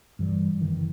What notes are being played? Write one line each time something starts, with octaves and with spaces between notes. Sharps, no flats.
G2 E3 G3
F#1 D#3 E3